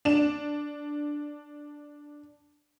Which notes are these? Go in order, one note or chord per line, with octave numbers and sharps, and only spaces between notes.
D4 E7